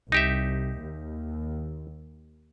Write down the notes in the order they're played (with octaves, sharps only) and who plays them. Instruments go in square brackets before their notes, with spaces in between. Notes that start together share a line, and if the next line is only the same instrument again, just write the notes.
[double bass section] C2 [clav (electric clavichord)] D#4 G4 E5
[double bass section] D#2